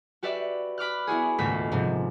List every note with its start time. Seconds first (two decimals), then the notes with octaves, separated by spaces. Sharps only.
0.23 F#4 G4 B4 D5 E5
0.78 B5 D6 F6 F#6
1.07 B3 E4 F#4 G#4
1.39 D#1 C#2 G#2 A3 B6
1.72 G#2 C3 F3